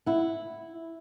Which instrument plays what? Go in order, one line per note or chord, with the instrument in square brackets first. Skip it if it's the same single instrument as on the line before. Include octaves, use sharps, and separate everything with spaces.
[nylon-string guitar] E4 F#5